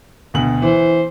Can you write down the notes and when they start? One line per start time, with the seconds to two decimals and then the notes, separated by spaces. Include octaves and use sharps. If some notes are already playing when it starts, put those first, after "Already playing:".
0.34 D2 B2 F#7
0.62 E3 C5